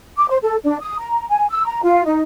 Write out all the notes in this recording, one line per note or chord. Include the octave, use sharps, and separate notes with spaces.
D6
C5
A4
D4
D#6
A#5
G#5
E6
A#5
F4
D#4